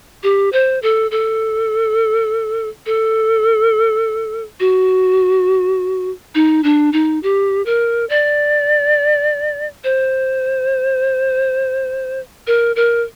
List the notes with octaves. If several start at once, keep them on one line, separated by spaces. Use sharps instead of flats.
G4
C5
A4
A4
A4
F#4
D#4
D4
D#4
G4
A#4
D5
C5
A#4
A#4